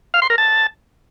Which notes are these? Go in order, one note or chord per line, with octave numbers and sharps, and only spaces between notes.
F5
C6
A#4
A5